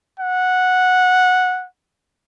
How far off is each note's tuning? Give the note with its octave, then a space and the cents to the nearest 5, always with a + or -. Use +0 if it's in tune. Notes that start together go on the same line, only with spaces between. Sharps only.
F#5 -10